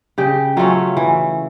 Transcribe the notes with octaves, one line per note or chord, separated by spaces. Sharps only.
C#3 G4
F#3 A3 C#4 F4
E3